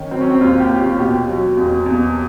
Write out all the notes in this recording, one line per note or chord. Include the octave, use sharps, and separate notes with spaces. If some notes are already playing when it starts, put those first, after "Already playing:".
Already playing: D#3 C#4
F#3 C4
C#4
C4
D#2 F4
G4
D#2
F4
B2 G4
F#3
E2
E2